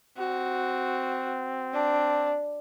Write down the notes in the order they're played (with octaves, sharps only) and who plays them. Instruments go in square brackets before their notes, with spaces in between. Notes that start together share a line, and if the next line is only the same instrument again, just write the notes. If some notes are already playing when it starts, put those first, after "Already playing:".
[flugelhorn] C4 [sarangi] F#4
[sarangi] D4